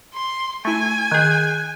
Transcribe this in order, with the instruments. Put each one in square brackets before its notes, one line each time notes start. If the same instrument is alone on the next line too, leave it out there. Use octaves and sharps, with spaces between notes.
[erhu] C6
[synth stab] A3 E4 [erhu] G#5
[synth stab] D#3 G#4 [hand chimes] F#6 G6